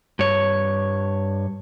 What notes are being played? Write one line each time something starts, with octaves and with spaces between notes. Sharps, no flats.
G2 C#5